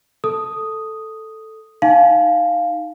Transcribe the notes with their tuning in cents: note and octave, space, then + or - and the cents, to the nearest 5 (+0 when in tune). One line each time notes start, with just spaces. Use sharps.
A4 +0 D#6 +0
D#4 +0 F5 +0 G#5 +0